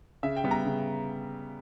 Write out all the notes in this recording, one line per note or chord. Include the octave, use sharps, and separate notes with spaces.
C#3 E5
G5
G3 B3
A#5
C#3